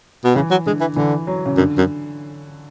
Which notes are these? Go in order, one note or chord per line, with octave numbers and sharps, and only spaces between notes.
B2
C#3 E3
F#3
D3 G#3
E3
D3 E3
F#3
C#3
F#2 D3
F#2